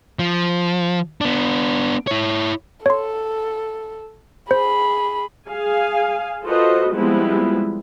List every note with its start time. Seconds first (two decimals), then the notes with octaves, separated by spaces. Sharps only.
0.19 F3
1.21 B3 D4
2.07 E4 C#5
2.86 A4 C#5 C6
4.51 G#4 C5 B5
5.48 G#4 F5 G#5
6.44 F4 F#4 A4 B4 C5 D#5
6.94 F3 G3 G#3 B3 C4 E4